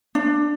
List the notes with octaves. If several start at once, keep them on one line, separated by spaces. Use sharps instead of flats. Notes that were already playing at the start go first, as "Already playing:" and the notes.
D4